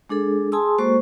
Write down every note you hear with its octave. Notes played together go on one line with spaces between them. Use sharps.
G#3 D4 G#4 A4
G#4 G#5 A5 C6 D#6 E6
G#3 A#3 F#4 A4 C5 C#6